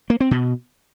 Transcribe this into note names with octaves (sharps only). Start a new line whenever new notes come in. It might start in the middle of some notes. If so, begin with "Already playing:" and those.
A#3
C4
B2